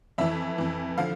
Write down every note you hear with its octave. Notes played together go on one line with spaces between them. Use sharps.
F2 E3 E5
F2 E3
D3 F3 F5